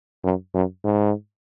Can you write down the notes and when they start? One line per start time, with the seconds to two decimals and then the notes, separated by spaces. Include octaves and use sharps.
0.24 F#2
0.54 F#2
0.84 G#2